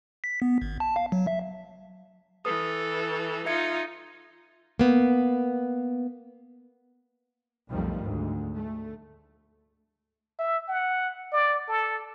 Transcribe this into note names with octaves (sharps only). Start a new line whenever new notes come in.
B6
B3
G#1
A5
F5
F#3
E5
E3 A4 B4 D#6
D#4 F4 E5 G#6 C#7
A#3 B3
B1 F2 D#3 F3 G3 A3
D2 G#2
A3
E5
F#5
D5
A4